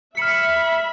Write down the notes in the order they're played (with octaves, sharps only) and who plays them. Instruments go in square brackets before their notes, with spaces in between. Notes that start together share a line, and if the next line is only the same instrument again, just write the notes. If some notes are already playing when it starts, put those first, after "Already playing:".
[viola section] E5 [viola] B5 [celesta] F6 C#7